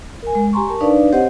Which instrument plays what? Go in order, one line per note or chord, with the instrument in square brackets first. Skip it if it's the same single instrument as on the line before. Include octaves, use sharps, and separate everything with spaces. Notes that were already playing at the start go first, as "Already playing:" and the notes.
[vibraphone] A#4 G#5
G#3
G4 G#5 A#5 C6 C#6
A#4 A5 C#6
D4 D#4 B4 D5 F5
C4 G4 C5 C#5 D#5 F#5